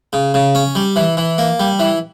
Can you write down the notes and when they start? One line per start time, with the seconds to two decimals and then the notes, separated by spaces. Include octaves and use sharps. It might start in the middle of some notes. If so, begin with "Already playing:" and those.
0.13 C#3
0.34 C#3
0.55 C#4
0.75 G3
0.96 E3
1.17 E3
1.38 A#3
1.60 G3
1.79 E3